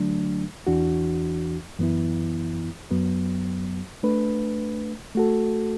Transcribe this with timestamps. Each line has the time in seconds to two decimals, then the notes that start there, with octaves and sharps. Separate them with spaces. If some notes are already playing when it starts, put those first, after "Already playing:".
Already playing: D3 F#3 A3 D4
0.67 E2 E3 D4 F#4
1.79 F#2 E3 B3 E4
2.91 F#2 F#3 B3
4.03 A3 D4 B4
5.15 A3 F#4 A4